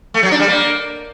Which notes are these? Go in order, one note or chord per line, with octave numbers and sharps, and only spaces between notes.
A3
F#3
D4
G3
A#3